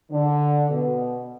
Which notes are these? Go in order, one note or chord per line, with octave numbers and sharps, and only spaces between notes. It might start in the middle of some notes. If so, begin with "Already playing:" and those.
D3
B2